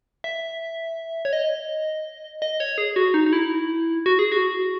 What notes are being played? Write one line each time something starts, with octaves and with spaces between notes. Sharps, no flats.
E5
C#5
D#5
D#5
C#5
G#4
F#4
D#4
D#4
E4
F#4
G#4
F#4